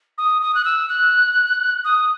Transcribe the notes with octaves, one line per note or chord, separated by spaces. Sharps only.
D#6
D#6
F#6
E6
F#6
D#6